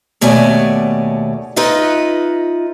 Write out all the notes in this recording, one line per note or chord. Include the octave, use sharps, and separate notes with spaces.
D#2 B2 A3 C#5 D5 G#5
D#4 F4 B4 D#5 E5